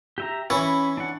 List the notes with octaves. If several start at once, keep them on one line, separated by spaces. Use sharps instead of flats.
G4 E5 A#5
E3 C#4 E4 C#5 B5
D4 F#5